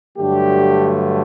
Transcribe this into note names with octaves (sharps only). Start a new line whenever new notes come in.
G2 D3 F#3 A3 G4